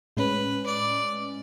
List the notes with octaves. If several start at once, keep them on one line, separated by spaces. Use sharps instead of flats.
A2 G#3 C#4 B4
D5